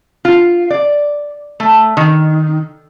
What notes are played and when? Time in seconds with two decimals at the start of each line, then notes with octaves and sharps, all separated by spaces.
0.25 F4
0.71 D5
1.60 A3
1.97 D#3